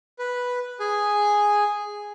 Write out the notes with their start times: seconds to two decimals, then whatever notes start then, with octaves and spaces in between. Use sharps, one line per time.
0.19 B4
0.80 G#4 G#5